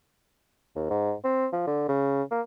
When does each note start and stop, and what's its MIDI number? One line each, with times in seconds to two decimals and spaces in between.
0.76 0.89 39
0.90 1.14 44
1.24 1.48 60
1.53 1.67 53
1.67 1.87 50
1.88 2.23 49
2.31 2.41 58